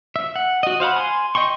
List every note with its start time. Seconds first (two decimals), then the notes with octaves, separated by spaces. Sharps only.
0.16 E5
0.36 F#5
0.63 F#4 D#5
0.80 C5 F5 F#5 B5
0.96 G#5 C6
1.35 D#5 G5 C6 C#6